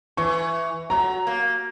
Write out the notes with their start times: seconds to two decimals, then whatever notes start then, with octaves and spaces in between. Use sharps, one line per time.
0.17 E3 C#6
0.90 F#3 A#5
1.27 A#3